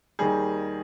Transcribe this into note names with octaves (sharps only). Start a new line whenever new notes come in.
D#2 D#3 G3 G#4